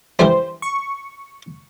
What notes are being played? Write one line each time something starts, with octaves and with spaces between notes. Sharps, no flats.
E3 G3 A3 C5
C#6